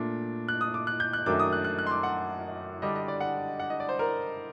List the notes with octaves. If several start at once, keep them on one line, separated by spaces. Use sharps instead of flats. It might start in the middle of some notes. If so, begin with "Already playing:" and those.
Already playing: A#2 A3 D4
F#6
D#6
D6
F#6
G6
F#6
F#2 D#3 A3 D4 D6
D#6
F#6
F#6
F#6
C6
D6
F#5
D3 G3 D4 D#5
D#5
D5
F#5
F#5
D#5
D5
C5
A#4